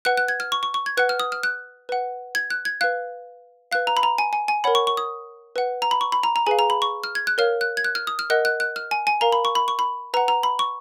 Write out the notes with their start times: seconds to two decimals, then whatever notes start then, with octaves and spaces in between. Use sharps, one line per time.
0.05 B4 F#5 F#6
0.17 F#6
0.28 G#6
0.40 F6
0.52 C#6
0.63 C#6
0.74 C#6
0.86 G#6
0.97 B4 F#5 F#6
1.09 F6
1.20 D#6
1.32 F6
1.43 F#6
1.89 B4 F#5
2.35 G#6
2.50 F#6
2.65 G#6
2.81 B4 F5 F#6
3.71 B4 F5 F#6
3.87 A#5
3.97 B5
4.03 A#5
4.18 G#5
4.33 G#5
4.48 G#5
4.64 A#4 C#5 F#5 B5
4.75 C#6
4.87 C#6
4.97 D#6
5.56 B4 F#5
5.82 A#5
5.91 B5
6.01 C#6
6.12 B5
6.23 A#5
6.36 A#5
6.46 G#4 B4 F5 G#5
6.59 A#5
6.70 B5
6.82 C#6
7.04 F6
7.15 G#6
7.27 F#6
7.38 A#4 C#5 F5 F6
7.61 F#6
7.77 G#6
7.84 F#6
7.95 F6
8.07 D#6
8.19 F6
8.30 A#4 D#5 F#5 F#6
8.45 F#6
8.60 F#6
8.76 F6
8.91 G#5
9.07 G#5
9.21 A#4 F5 A#5
9.32 B5
9.45 C#6
9.55 B5
9.68 C#6
9.79 B5
10.14 B4 F#5 A#5
10.28 A#5
10.43 B5
10.59 C#6